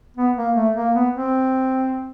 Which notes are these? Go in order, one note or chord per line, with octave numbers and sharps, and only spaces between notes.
B3
A#3
A3
A#3
B3
C4